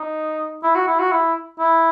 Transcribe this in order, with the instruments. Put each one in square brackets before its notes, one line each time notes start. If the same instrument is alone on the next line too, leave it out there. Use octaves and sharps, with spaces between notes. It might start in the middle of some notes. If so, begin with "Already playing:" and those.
Already playing: [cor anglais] D#4
E4
F#4
E4
F#4
E4
E4